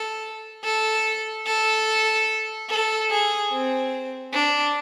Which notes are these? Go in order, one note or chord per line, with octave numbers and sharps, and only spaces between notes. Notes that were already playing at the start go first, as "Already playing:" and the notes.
Already playing: A4
A4
A4
A4
G#4
C4
D4